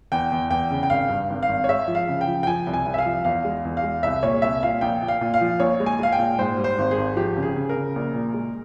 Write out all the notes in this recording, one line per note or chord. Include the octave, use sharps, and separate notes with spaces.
E2 G5
E2
E2 G5
C#3
G5
G#1 F5
G2
G#1
F5
G#1
C#5
G#3 E5
F3
F5
C#3
G5
F3
G5
F3 G#5
C2
G#5
C2
E5
F5
F3
E2 F5
G#3
E2
F5
G#3
C2 E5
A#2 C#5
C2 E5
A#2 F5
A#1 G5
A#2
F5
A#2
F5
F3
A#1 C#5
G#3
G#5
G#3 F5
G5
A#2
G#2 C5
G3
C5
G#1
G#4
G#1
F3 G4
C#3
G#4
C#3
A#4
C#3
A#1
A#2
G#3